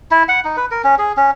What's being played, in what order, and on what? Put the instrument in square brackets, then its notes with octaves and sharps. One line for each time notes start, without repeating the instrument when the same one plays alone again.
[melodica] E4
F#5
D#4
B4
A#4
C#4
G#4
C#4